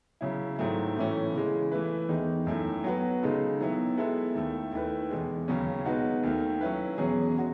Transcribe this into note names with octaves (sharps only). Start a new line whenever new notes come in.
C#3 F#3 C#4 E4
G#2 D#3 F#3 A3 E4
A2 E3 A3 C#4
C#3 E3 G#3
E3 A3 E4 B4
E2 D#3 G#3 D#4
F#2 D#3 A3 E4
F#3 B3 F#4 B4
C#3 G#3 D#4 A4
D#3 F#3 B3 E4
G#3 B3 E4 A4 E5
D#2 D#3 A3 E4 A4
D#2 D#3 A3 E4 B4
E2 B2 G#3
D#2 C#3 F#3 C#4
B2 G#3 D#4 F#4 B4
D#2 D#3 A3
F#3 C#4 E4 B4
E2 B2 F#3 C#4 G#4
G#3 C#4 F#4